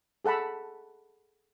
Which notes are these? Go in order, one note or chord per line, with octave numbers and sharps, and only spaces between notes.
G#4 A4 F#5 A5 B5